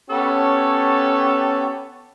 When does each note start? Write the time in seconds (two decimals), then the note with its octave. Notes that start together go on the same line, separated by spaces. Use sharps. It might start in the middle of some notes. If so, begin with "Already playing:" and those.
0.10 B3 C#4 G4 A4 C#5 A5